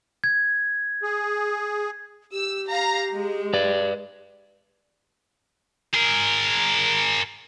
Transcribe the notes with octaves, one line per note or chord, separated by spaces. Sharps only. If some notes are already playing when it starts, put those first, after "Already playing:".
G#6
G#4
G4 E6
F5 A#5
G#3
B4 D5
G#4 A#4